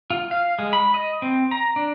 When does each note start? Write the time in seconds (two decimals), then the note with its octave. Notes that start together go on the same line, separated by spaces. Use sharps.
0.10 F4
0.31 F5
0.59 G#3
0.73 B5
0.94 D#5
1.22 C4
1.51 A#5
1.76 D4